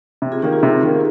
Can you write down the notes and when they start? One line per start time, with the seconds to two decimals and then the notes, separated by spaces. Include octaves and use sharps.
0.22 C3
0.32 F4 G#4
0.42 D#3 A#3 D#4 G4
0.53 F4
0.63 C3
0.83 D#3 A#3